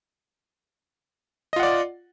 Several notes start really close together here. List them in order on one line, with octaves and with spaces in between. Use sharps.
D#5 F4 F#5 D5